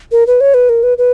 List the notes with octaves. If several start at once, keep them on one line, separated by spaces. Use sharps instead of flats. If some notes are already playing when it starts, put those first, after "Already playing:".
A#4
B4
C#5
B4
A#4
B4
B4